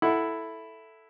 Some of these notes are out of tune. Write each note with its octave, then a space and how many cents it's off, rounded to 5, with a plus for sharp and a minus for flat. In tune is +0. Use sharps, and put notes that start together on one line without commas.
E4 +0 A4 +0 F#5 +0